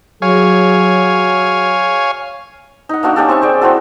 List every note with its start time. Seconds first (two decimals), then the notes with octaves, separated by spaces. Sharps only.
0.22 F#3 G#4 C#5 F5 G#5
2.89 D#4 F#5
3.03 A#3 D4 F#4 E6
3.16 C#4 D#4 G4 A4
3.28 C4 E5 G#5 C#6
3.42 G#4 D5 G5
3.61 C4 E4 F#4 A4